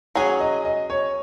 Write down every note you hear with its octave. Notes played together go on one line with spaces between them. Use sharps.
F#3 C#4 G#4 C#5
D#5
D#5
C#5